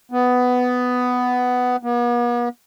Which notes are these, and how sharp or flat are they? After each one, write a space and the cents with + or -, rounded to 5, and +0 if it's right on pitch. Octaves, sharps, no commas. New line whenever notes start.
B3 +10
B3 -45